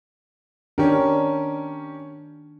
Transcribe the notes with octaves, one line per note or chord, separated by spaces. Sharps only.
D#3 C#4 D4 G4 A#4